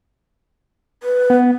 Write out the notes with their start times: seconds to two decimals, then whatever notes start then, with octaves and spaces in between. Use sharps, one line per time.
1.03 B4
1.30 B3